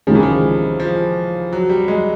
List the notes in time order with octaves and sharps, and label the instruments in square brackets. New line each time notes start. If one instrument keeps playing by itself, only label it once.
[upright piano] C#2 C3 D#3 G#3 C#4 [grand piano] F3
[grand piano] E3
F3
F3
F#3
G3
G#3